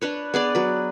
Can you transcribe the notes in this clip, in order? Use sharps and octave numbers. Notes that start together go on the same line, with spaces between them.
D4 B4 C#5
B3 G#4 D5
F#3 B4